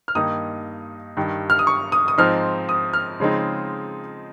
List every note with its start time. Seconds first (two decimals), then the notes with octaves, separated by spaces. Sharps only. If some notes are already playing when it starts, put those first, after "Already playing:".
0.08 F6
0.15 G2 D#3 A#3 D#4 D#6
1.17 G2 D#3 G3
1.50 F6
1.59 D#6
1.67 C#6
1.92 D#6
2.08 D#6
2.18 G#2 F3 C4 D#4 F6
2.69 D#6
2.93 F6
3.20 C#3 F3 G#3 C4 D#4